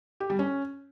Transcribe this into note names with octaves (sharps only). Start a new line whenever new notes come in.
G4
G3
C#4